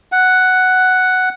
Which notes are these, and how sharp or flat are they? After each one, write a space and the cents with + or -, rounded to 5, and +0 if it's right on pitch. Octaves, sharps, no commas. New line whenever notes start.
F#5 +5